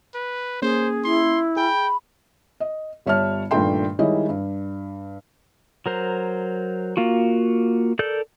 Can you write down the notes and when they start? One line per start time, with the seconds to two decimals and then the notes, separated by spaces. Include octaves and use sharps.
0.14 B4
0.62 A#3 C#4 G#4 C5
1.04 E4 C6
1.57 G#4 G5 B5
2.60 D#5
3.06 G1 G3 C#5 E5 A5 F6
3.51 G2 A#2 D#3 A3 G5 C6
3.99 D#3 G3 G#3 E4 C#5 D#5
4.29 G2
5.86 F#3 A#4 C5
6.97 A#3 F4 F#4
7.99 A4 A#4 D5 G6